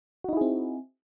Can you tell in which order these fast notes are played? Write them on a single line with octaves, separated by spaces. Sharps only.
F#4 D#4 E4 G#4 C4